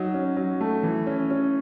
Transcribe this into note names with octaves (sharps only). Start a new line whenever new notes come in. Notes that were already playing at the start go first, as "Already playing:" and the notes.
Already playing: F#3 D#4
C#4
F#3
A3
E3
C#4
C#4